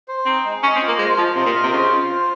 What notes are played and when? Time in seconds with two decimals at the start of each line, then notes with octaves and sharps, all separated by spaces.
0.08 C5
0.26 C4 D#4
0.45 G#3
0.63 C#4 D#5
0.76 C4
0.81 F4
0.88 A#3
0.99 G#3 C5
1.18 F3 F4
1.36 C3 D#5
1.46 A#2
1.55 F4
1.63 C3
1.73 C#3 C5
1.91 F4
2.10 C5